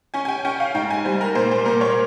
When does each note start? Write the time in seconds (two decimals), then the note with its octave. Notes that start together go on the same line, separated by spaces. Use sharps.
0.14 C#4 G#5
0.25 G#5
0.28 G5
0.45 C#4 G5
0.60 F5
0.74 G#2 G5
0.90 G#5
1.04 G3 C5
1.21 A#4
1.35 A#2 C5
1.51 C5
1.65 A#2 A#4
1.81 C#5